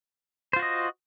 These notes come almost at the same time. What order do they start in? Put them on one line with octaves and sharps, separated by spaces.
C5 F4 F#4 D#5